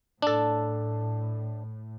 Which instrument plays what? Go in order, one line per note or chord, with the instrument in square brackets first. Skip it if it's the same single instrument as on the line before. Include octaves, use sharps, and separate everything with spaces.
[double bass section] A2 [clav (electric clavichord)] D4 A4